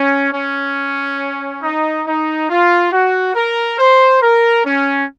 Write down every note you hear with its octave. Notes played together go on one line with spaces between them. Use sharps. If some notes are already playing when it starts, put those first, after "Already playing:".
Already playing: C#4
C#4
D#4
D#4
F4
F#4
A#4
C5
A#4
C#4